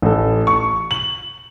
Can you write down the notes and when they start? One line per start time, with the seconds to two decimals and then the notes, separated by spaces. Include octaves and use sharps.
0.02 A1 A4
0.47 C#6
0.91 F#7